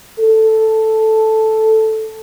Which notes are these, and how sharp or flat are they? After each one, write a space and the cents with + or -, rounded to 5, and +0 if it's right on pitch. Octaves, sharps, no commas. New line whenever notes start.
A4 +0